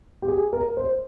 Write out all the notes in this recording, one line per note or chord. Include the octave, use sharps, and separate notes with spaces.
G4
G#4
A#4
C5